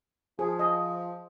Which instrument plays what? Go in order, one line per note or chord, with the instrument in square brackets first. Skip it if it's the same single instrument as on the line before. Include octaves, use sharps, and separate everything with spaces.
[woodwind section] F3 [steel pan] G#4
[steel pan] D#5